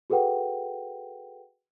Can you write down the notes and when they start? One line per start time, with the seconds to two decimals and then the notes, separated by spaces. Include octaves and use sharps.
0.10 F#4 G#4 A4 B4 F#5 G5